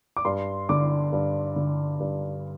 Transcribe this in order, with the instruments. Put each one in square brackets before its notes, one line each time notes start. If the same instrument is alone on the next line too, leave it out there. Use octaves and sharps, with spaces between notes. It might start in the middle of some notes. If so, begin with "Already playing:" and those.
[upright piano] D6
G2 C6
D3 D6
G2
D3
G2